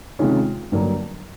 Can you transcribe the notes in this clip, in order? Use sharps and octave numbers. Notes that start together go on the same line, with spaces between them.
C3 D#3 G#3 C#4 F4
G2 D3 F#3 A#3